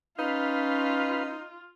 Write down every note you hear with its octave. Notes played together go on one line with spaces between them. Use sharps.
C#4 D#4 F4 B4 F5